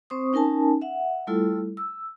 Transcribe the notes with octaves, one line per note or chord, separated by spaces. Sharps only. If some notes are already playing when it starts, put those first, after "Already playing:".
C4 C5 C#6 D#6
C#4 D#4 A#4 G#5 A5
E5 F#5
G3 A3 E4 F4 A4
E6